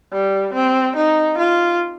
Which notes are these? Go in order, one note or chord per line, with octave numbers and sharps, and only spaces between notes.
G3
C4
D#4
F4